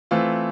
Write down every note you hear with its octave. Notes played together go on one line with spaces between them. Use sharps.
E3 A3 C4 F4